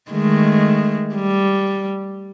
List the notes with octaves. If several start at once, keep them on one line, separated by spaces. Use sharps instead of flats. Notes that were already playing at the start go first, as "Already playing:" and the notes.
D#3 G#3 A3
G3